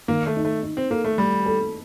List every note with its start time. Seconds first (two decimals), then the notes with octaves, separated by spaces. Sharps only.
0.08 D#3 A#3
0.27 A3
0.36 D#4
0.45 A3
0.63 D#4
0.77 C4
0.90 A#3 A4
1.05 A3
1.18 G3 A3
1.46 A4